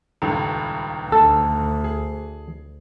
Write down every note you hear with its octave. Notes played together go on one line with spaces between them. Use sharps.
D#1 C#2 G2
D2 A4
G#4